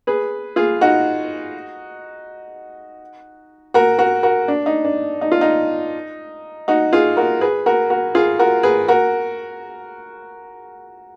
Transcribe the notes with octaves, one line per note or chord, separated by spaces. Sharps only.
G#4 B4
F4 G#4
D#4 F#4
F#4 A#4
F#4 A#4
F#4 A#4
D4
D#4
D4
D#4
F4
D#4
D#4 F#4
F4 G#4
F#4 A#4
G#4 B4
F#4 A#4
F#4 A#4
F4 G#4
F#4 A#4
G#4 B4
F#4 A#4